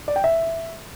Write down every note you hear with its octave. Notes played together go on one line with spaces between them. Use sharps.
D5
G5
E5